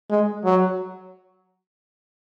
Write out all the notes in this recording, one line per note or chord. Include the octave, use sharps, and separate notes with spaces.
G#3
F#3